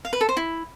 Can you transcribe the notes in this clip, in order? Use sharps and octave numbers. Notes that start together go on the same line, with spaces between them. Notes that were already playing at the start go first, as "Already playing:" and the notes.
F5
B4
A4
C5
E4